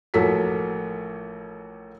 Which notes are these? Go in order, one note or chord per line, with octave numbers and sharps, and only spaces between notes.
A1 F3 A#3 F#4 A4 B6